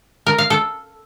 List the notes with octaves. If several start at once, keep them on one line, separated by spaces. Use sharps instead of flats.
A#4
F5
A4